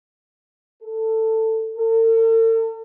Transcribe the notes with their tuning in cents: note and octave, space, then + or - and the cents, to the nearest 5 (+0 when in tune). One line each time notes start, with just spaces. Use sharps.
A4 +15
A4 +45